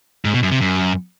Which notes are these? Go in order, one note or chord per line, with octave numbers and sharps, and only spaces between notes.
G#2
B2
F#2
C3
F#2